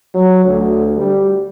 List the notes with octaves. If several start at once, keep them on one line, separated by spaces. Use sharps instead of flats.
F#3
D2
G3